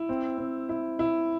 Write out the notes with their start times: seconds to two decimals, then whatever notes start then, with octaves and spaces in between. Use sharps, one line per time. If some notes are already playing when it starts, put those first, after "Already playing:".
Already playing: E4
0.09 C4
0.38 C4
0.69 E4
0.99 E4